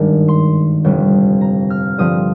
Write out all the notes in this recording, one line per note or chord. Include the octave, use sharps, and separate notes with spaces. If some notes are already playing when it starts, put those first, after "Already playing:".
Already playing: G#1 G2 D#3 G#3 D4
C6
G1 F2 C3 G3
A#5
F6
G2 D3 F3 C4 D#6